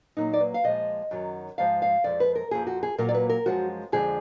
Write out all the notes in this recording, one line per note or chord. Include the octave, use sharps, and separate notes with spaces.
A#2 F#3 A#3 D#4
D5
B4
F5
A#2 F3 G#3 D#5
F#2 D#3 F#3
G#2 F3 G#3 F5
F5
F2 F3 G#3 D5
B4
A#4
F2 F3 A#3 G#4
F#4
G#4
A#2 F#3 A#3 A#4
D5
B4
A#4
F#2 D3 F3 G#3 F#4
F2 D3 F3 G#3 G#4